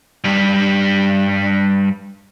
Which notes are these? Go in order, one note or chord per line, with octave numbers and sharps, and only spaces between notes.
G2 G3